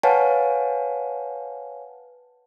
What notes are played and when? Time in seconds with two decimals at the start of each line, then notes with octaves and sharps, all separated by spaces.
0.03 B4 C#5 F5 F#5 G#5 A5